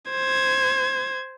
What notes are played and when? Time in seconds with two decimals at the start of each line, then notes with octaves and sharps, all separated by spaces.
0.11 C5 G#6